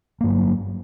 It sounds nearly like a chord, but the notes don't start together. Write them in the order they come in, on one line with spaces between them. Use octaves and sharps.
A#3 G2 F#3